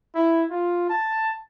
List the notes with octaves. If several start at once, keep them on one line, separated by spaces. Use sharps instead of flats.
E4
F4
A5